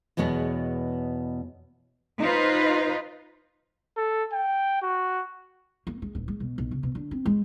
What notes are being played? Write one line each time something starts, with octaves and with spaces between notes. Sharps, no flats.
E2 B2 G#3 B3 C#5
D#4 F4 B4 C5
A4
G5
F#4
A#3
G#3
D#1
G#3
B2
B1
C#3
B2
D3
C4
G#3